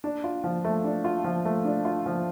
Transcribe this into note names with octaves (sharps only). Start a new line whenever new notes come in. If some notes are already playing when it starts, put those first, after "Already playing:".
D4
F4
F3
A3
D4
F4
F3
A3
D4
F4
F3